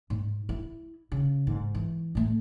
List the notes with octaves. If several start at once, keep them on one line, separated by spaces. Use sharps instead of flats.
G#2
E4
C#3
G#2
E3
A2 A3